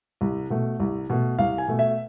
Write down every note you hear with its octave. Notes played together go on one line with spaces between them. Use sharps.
C2
B2 A3
C2
B2 A3
C2 F5
G#5
B2 A3
E5